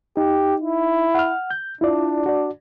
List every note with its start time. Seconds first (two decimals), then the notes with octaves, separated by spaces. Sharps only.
0.17 D#4 G4
0.62 E4
1.15 F#5 F6
1.51 G6
1.81 D4 E4 F4 D5
2.26 F#4 D5